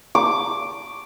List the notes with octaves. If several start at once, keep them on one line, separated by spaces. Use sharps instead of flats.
D6